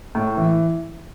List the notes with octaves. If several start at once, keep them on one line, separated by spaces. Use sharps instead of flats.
A2
E3